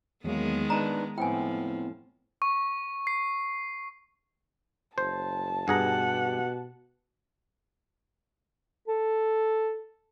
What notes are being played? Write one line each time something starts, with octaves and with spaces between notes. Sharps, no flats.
E2 D#3 F#3 G#3 A#3 B3
D4 D#4 B4 A#5
A2 F3 B3 C4 E4 G5 G#5
C#6
C7
F#1 C5 A5
G2 B2 G4 G#4 F#5 A#5
A4